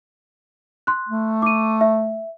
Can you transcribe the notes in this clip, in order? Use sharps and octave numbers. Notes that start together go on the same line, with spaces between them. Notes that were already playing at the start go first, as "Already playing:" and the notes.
C6 F#6
A3
D6 D#7
E5